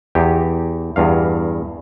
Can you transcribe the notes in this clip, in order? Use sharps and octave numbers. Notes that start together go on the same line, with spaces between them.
E2 G4
E2 G2 F5